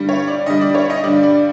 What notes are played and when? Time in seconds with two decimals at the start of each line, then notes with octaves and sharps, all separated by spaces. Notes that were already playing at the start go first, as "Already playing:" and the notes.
Already playing: G2 D3 G3
0.09 C#5
0.28 D5
0.46 G2 D3 G3 D#5
0.61 D5
0.75 C#5
0.90 D#5
1.04 G2 D3 G3 D5
1.23 D5